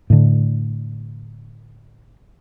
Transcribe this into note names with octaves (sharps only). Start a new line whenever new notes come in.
A2 D3